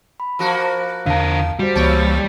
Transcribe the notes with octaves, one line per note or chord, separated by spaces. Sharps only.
B5
F3 A#3 F#4
E2 D3 A#4 F5 A5
G3 F#4 C5
C#2 G#2 E3 A#3 C#5 A5 A6